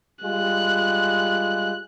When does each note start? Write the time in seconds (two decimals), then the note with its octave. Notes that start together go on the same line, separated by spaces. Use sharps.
0.24 G3 G#3 F4 F#6